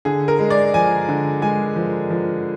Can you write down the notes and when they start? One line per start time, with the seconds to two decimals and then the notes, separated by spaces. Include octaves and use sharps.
0.05 D3 G#4
0.28 A#4
0.39 G#3
0.50 D5
0.74 F3 G#5
1.08 D3
1.41 G#3 G#5
1.76 F3
2.10 F3